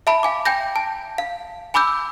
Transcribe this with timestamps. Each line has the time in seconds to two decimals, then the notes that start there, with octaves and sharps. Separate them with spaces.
0.07 E5 A5 B5
0.23 F5 G#5 D6
0.45 G5 G#5 G6 A#6
0.76 A5
1.18 F5
1.74 G#5 B5 D6 E6 G6